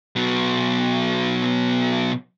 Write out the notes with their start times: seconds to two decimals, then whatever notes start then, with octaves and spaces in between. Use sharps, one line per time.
0.16 B2 F#3